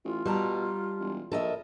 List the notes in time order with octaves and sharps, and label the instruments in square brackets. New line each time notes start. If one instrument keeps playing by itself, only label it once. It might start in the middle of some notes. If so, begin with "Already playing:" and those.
[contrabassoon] A1 [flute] F4
[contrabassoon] B2 [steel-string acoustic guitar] G3 A5 A#5
[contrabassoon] E1
[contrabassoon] A#1 [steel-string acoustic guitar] A4 D#5 E5 [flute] A#4